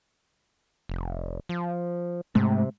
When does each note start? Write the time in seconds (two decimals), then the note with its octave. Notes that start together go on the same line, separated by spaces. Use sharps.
0.89 F1
1.49 F3
2.35 G#2 C3 G#3 A3